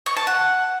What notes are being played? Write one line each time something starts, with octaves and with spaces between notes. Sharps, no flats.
C#6
A5
F#5